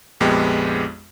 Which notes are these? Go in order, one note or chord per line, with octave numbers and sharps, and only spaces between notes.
A#1 F2 G#3 B3 G4